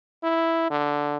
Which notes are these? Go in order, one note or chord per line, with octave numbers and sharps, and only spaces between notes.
E4
D3